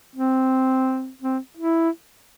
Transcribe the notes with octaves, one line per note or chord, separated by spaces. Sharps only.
C4
C4
E4